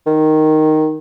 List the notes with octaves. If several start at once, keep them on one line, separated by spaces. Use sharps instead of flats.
D#3